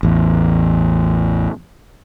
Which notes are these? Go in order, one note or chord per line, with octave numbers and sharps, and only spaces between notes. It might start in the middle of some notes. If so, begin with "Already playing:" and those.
A1 E2